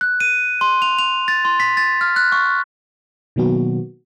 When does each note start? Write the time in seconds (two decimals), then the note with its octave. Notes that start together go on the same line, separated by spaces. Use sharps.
0.01 F#6
0.20 D#7
0.61 C6
0.82 F7
0.99 F7
1.28 A6
1.45 C6
1.60 B6
1.77 A6
2.01 F6
2.16 F#6
2.32 C#6
3.36 B2 D#3 F#3 A#3 B3 F#4